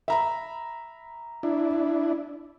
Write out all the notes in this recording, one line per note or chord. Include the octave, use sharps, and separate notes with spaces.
E5 A#5 B5
D4 E4